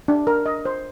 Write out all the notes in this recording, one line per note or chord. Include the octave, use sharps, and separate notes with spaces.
D4
A#4
D#5
C5